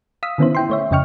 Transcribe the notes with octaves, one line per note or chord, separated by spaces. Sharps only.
F5 D#6 E6 B6
D3 D#3 B3 C#4 E4 C5
E4 G5 C6
A3 C#5 E5
F2 C#3 D#5 G5 C#6 F6